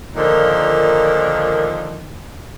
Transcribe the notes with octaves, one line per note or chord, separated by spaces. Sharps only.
A#2 D3 D#3 F3